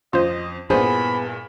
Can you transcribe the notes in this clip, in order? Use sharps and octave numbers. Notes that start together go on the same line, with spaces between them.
F2 F4 C5 D#5
G2 A#2 B3 D4 E4 G#4 C5 B5